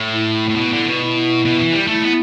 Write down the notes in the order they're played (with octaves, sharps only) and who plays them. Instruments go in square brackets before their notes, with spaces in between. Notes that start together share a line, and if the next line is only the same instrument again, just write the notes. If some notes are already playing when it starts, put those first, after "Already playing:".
Already playing: [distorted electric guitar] A2
[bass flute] E4
[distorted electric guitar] A2
B2
D3
B2
[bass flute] E4
[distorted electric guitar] B2
E3
G3
[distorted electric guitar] A3 [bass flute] E4
[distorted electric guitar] B3